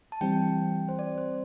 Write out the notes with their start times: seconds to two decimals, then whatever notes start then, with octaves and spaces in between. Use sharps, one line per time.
0.12 A5
0.21 E3 G3 C4 G5
0.89 C5
0.99 D5
1.18 C5